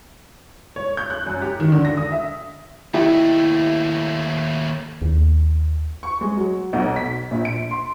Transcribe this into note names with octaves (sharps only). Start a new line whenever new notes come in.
C#5
G6
F#6
F#2
G4
D#3
D3
A#6
D#6
E5
D#2 A3 E4 G4 D#5
D#2
C#6
G#3
F#3
B1
B6
A#1
D7
C6